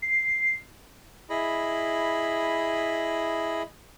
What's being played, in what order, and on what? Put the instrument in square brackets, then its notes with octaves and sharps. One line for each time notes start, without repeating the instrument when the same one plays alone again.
[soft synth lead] C7
[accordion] E4 G#4 D#5 B5